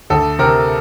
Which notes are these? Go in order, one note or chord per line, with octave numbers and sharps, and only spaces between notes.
D2 A4
C3 A#4